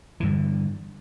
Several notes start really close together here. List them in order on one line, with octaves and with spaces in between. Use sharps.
E3 G2 D3